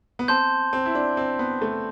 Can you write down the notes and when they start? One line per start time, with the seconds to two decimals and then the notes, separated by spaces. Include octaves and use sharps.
0.19 B3
0.28 C4 A5 C6 G6
0.73 C4
0.86 E4
0.95 D4
1.17 C4
1.39 B3
1.62 A3